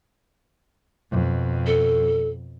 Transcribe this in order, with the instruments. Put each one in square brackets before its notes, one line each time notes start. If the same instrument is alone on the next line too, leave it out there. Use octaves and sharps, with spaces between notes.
[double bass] F2 B2
[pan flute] A4